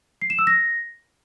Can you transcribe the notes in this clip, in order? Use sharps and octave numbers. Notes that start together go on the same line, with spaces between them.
C7
E7
E6
A#6